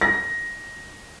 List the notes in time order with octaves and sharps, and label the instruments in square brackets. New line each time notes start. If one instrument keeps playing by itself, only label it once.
[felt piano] A#6